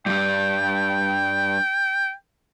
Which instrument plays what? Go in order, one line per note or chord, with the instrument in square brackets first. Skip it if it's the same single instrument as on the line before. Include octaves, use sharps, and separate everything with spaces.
[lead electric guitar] G2 G3 [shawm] G5